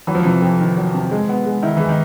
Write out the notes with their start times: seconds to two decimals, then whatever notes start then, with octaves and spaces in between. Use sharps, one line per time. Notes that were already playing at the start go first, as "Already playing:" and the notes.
0.07 E3 F#3
0.15 F3
0.23 C3 E3
0.42 F2
0.60 D#3
0.77 F#3
0.95 C3
1.11 G#3
1.29 B3
1.46 G#3
1.62 D#3 E4
1.77 E3 G#3
1.89 D#3